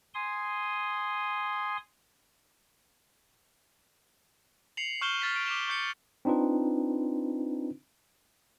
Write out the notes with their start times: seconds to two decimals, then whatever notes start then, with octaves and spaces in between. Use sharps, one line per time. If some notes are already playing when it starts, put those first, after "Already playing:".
0.14 G#5 C6 D#6
4.77 C7 C#7 F7 F#7
5.01 C#6 F6 G6 E7 G7
5.22 F6 A6 B6
5.34 C#6 D7
5.46 D6 B6 E7 F7
5.68 C#6 G6 C#7
6.25 C4 D4 D#4 F4 B4